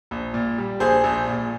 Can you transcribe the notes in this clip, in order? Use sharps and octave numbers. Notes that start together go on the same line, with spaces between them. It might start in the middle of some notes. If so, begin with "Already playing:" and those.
A#1
A#2
G3
A#1 G#4 C5
A#1
A#2